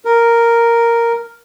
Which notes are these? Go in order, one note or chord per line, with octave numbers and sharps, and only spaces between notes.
A#4